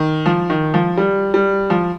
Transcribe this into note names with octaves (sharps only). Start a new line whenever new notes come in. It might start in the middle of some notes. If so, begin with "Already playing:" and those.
Already playing: D#3
F3
D#3
F3
G3
G3
F3